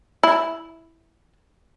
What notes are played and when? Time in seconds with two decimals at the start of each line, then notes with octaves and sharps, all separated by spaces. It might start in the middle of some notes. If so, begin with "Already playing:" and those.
0.23 E4